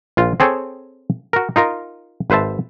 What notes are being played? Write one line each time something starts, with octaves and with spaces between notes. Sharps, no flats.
A#1 F4
C4 G#4 A4 C#5 G5
F#4 A#4
D#4 F4 A#4
G#1 B4 C5 E5 A5